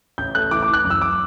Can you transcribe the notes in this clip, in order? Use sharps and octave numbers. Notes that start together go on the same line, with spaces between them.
A1 G6
A3 F#6
E3 D6
D6
E3 F#6
F#2
E6
D6